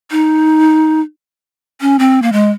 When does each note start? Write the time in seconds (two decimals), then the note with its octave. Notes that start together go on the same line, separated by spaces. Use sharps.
0.11 D#4
1.81 C#4
1.99 C4
2.22 A#3
2.32 G#3